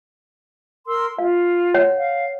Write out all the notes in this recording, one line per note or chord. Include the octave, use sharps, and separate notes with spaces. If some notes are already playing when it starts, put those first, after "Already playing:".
A#4 C6 E6
F4 F5
C#5 F#5
F5